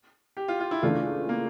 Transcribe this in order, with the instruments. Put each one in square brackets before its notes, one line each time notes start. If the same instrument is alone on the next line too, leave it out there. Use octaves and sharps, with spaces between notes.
[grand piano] G4
F4
F4
E4
[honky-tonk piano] C#2 C#3 E3 A3 D4 [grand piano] F4
[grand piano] A#3